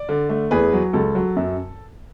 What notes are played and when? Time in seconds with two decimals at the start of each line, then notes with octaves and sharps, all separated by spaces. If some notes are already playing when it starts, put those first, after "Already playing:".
Already playing: D5
0.09 D3
0.29 A3
0.51 E2 G#4 B4
0.73 F#3
0.93 C#2 A4
1.15 F#3
1.36 F#2